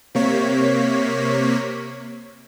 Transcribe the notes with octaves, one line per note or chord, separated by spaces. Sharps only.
C3 A#3 C#5 B6